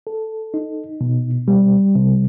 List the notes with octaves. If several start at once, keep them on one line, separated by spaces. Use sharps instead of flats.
A4
D#4
B2
G3
C3